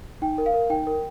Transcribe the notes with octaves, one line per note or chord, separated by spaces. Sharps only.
D#4 G5
A#4
F5
A#4
D#4 G5
A#4